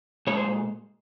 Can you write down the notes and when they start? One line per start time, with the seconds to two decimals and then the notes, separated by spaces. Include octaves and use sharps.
0.27 A#2 G#3 C#5
0.37 C5